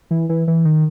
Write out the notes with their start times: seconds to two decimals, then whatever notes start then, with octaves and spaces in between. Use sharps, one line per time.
0.11 E3
0.29 E3
0.48 E3
0.65 D#3